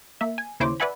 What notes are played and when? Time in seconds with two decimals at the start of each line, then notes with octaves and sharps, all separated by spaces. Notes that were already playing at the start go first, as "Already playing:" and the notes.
0.21 A#3 E5
0.38 G#5
0.60 D#2 C#3 E4 C5 C#5 D6
0.80 B4 D5 E5 F#5 G#5 B5